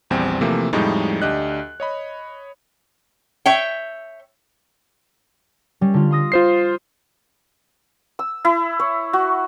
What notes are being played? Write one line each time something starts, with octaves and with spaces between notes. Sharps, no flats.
A#1 E2 G3 C4 G5
C3 E3 F3 A3 A#3
F2 A2 F3 G3 G#3 D#4
D2 D4 G4 D#5 F#6
C#5 D#5 B5
C#5 E5 G5
G3 C#4
D3 F4
C6 D#6 A#6
F4 C5 C7
E6
E4
C#5
F#4